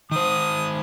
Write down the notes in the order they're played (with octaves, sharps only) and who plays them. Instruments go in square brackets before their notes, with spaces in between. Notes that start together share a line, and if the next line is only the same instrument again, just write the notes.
[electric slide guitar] D#3 C5 [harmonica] D#6